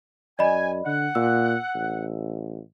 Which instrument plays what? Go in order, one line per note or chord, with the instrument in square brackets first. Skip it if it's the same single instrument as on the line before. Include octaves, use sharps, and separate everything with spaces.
[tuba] F#2 [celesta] D5 D#5 B5 [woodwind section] G#5
[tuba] D3 [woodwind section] F#5
[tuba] A#2 [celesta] E6
[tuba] A1